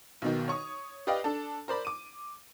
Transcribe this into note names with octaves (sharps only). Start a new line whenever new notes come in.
B1 B2 D#3
C#5 C#6 D#6
G4 B4 D5 D#5 F5 G5
D4 A4 A5
A#4 C5 D5 B5
D6 D#7